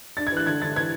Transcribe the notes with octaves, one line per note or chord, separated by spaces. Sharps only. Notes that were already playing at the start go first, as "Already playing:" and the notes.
D4 A6
G#6
E3 F#6
D3 G#6
D3 A6
E3 G#6